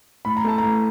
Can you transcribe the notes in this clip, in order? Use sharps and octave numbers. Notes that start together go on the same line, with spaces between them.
A2 B5
A#5
A3 A5
A2 A#5